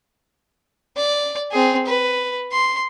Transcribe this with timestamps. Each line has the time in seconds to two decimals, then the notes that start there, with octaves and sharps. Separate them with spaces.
0.97 D5
1.51 C4 G#4
1.86 B4
2.52 C6